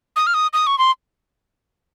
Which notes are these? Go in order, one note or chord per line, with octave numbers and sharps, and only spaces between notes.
D#6
F6
D#6
D#6
C#6
C6